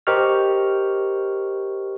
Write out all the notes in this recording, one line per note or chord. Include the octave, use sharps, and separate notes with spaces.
G4 A#4 C5 D#5 C#6 F6